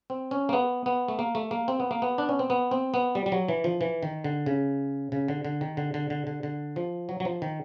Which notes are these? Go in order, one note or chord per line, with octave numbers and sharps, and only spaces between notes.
C4
C#4
A#3
B3
B3
A3
A#3
A3
A#3
C4
B3
A#3
B3
D4
C#4
C4
B3
C4
B3
G3
G3
F#3
E3
F3
E3
D#3
D3
C#3
C#3
D3
D3
D#3
D3
D3
D3
D3
D3
F3
F#3
F#3
F3
D#3